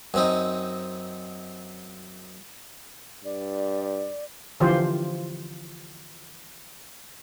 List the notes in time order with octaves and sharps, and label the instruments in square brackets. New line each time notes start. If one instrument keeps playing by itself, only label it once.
[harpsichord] F#2 C4 D#4
[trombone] G2 [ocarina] D5
[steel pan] D3 E3 F3 F4 G4 C5